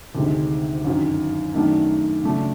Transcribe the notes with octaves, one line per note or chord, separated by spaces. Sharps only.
D2 C3 D#3 G#3
G1 F#2 D#3 F#3
F#2 D#3 F#3 A3 D4
C#3 F#3 A3 D4